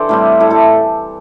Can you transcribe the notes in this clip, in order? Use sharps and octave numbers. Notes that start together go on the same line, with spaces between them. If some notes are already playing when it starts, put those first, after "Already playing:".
Already playing: E3 D4 E4 G4 A4 C5 D5
A2 G3 C4
E4 A4
E4 A4